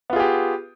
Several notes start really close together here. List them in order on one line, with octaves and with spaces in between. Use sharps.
B3 F4 G#4 G4